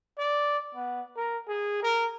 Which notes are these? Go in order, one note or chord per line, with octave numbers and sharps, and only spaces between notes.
D5
B3
A#4
G#4
A#4